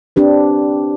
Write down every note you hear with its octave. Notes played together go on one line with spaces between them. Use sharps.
C4 D4 G4 B4